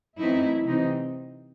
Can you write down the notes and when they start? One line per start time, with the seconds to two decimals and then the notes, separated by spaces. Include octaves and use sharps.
0.18 F#2 E3 A3 C4 D#4 E4
0.67 C3 E3 C4 D#4